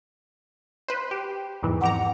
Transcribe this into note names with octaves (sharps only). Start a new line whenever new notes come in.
B4 C5
G4
E2 G#2 E3
F2 G4 F#5 A#5